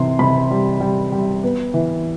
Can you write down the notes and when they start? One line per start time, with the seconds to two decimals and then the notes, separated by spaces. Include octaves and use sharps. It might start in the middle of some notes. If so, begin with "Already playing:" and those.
Already playing: C3 E3 C6
0.19 C3 B5
0.51 G3
0.80 G3
1.12 G3
1.44 B3
1.74 E3